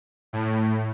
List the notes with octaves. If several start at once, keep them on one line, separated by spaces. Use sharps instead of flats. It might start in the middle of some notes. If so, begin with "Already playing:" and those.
A2